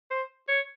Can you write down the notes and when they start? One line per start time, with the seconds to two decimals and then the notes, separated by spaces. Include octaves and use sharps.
0.10 C5
0.48 C#5